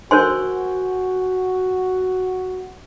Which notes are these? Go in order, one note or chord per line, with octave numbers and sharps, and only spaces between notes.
F#4 A#4 C5 G#5 C6 G6